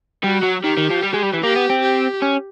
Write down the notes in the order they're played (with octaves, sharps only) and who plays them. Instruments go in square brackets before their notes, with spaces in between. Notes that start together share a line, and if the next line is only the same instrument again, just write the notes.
[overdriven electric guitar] G3 [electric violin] F#4
[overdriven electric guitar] F#3
[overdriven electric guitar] D#3 [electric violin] G4
[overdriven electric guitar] D#3
F3
G3
G#3
G3
E3
[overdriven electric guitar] A#3 [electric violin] G4
[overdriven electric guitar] B3
C4
[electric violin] G4
[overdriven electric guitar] C#4